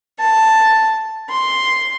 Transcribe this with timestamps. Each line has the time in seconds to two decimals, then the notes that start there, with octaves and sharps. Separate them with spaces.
0.19 A5
1.30 C6